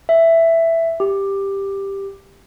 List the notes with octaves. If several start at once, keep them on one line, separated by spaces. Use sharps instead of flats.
E5
G4